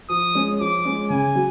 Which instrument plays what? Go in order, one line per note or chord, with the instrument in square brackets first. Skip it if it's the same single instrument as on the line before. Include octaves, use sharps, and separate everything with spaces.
[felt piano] F3 [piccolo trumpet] D#6
[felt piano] G#3 C#4
[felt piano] F3 [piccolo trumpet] D6
[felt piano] G#3 C#4
[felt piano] C#3 [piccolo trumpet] G#5
[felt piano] F#3